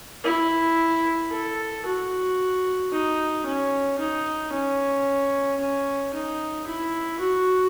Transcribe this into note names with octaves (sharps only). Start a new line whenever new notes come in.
E4
A4
F#4
D#4
C#4
D#4
C#4
C#4
D#4
E4
F#4